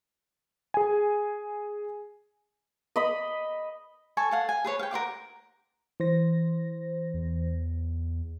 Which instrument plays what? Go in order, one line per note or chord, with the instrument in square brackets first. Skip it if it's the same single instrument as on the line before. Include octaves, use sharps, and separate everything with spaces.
[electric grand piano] G#4 G#5
[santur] D#5 B5 D#6
[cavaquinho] A4 G#5 C#6
A4 F5 F#5
G#5
G#4 B4 C#5
F5 G5
A#4 C5 F#5 D6
[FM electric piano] E3 C5 A#6
[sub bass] E2